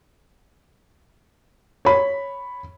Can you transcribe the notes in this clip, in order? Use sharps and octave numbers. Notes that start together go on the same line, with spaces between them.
C#5 B5